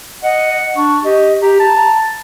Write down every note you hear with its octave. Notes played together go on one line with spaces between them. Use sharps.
D#5 F#5
D4 C#6
G4 D#5
G4 A#5
A5